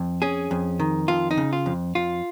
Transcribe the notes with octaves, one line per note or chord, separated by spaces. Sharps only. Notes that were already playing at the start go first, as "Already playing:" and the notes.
Already playing: F2
C#4 G#4
F2
D#3
F2 F4
D#4
C#3
F4
F2
F2 F4